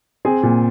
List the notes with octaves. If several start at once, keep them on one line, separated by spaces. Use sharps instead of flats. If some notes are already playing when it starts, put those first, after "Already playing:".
C4 G#4
A#2